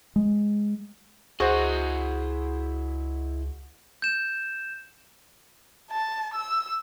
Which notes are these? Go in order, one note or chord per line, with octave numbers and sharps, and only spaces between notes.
G#3
C#2 E4 F#4 G#4 C5 D#5
G6 E7
A5
E6